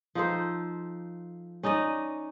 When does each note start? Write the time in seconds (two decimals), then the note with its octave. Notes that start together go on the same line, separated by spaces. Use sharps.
0.15 F3 D#4 A4 C5
1.63 C#4 D#4 D5 D#5